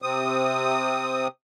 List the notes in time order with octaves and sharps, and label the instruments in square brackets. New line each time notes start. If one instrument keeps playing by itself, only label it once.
[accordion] C3 C4 D#6